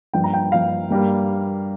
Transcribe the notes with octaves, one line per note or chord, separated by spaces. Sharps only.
G2 F3 A#3 G5
A#5
G5
G2 F3 A#3 F5
G2 G3 A#3